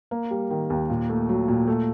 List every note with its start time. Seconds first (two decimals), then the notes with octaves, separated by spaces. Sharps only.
0.11 A#3
0.30 G3
0.50 D#3
0.70 D#2
0.90 A#2
1.10 A3
1.29 F#3
1.48 A#2
1.68 A3